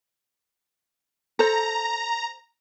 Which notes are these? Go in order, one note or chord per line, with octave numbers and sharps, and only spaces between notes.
A4 C5 A#5